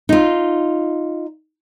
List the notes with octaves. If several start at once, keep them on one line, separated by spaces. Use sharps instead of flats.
D#4 F4